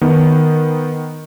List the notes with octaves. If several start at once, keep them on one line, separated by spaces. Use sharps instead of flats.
D#3 B3